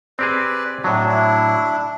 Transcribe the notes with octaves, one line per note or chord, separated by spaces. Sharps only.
C4 G4 G#4 B4 D5
A2 F#3 D4
D4 E4